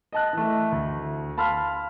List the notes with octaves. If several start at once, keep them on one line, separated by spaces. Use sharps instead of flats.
D#5 A5 F#6
E3 A3
D2
F5 A5 B5 C6 F6